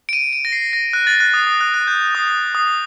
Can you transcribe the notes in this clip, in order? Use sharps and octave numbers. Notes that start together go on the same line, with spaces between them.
D7
D#7
D7
A#6
C7
A#6
F#6
A6
F#6
D#6
D#6
F#6
F#6
G6
D#6
D#6